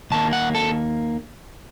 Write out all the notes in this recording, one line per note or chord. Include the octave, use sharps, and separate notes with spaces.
D#2 D#3 A#3 A5
F#5
A4